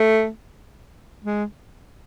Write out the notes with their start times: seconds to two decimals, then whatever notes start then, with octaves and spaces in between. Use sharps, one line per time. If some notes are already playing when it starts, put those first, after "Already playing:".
Already playing: A3
1.24 G#3